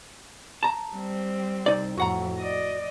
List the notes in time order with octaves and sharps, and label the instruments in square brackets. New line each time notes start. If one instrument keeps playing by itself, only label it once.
[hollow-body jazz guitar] A5 A#5
[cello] G3 C4
[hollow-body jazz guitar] C2 D#4 D5
[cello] F2 A2 [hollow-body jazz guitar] F#4 F#5 A#5
[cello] D5 D#5